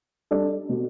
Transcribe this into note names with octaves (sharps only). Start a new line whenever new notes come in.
G3 D4 A4 D5
B2